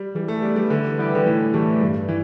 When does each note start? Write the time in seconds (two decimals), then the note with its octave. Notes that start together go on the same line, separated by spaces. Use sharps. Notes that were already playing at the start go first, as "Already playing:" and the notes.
Already playing: G3
0.15 E3 G3
0.28 A3
0.42 G3 B3 D4
0.56 G3
0.70 D3 E3
0.98 G3 B3 E4 G4
1.15 D3
1.26 A2 E3
1.54 E3 G3 A3 D4
1.81 G2 G3
2.09 E3